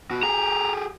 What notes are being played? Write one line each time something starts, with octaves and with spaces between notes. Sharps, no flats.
B2 F#4
G4 G#4 A#5